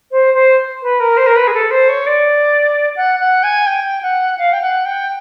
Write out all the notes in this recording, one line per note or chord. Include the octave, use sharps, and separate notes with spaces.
C5
C5
B4
A#4
C5
A#4
B4
G#4
A4
C5
C#5
D5
F#5
F#5
G#5
G5
F#5
F5
G5
F#5
G5